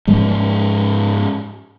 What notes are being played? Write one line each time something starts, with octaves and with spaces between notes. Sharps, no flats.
G#2 F3 G#3